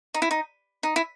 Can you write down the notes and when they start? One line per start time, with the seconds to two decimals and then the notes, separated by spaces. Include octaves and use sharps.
0.14 D#4
0.22 E4
0.31 D#4
0.83 D#4
0.96 E4